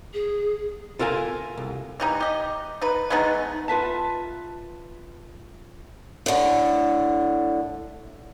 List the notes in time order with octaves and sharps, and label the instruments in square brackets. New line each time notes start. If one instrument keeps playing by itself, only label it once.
[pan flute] G#4
[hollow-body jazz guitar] F4 A4 A#4 F5 G#5
C2
[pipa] E3 G3 D#4
G4 D#5
D#4 B4
G#3 A3 B3 D#4
[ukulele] F4 B4 E5 A5
[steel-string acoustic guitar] A2 D3